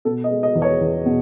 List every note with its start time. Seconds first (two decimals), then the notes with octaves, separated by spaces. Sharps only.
0.05 B2 A4
0.24 D#5
0.30 G#3
0.43 D#5
0.55 E2
0.62 C#5
0.81 E2
1.06 B2